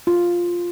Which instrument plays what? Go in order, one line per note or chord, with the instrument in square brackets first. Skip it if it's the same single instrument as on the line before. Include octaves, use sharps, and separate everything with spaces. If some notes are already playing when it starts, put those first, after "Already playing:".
[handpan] F4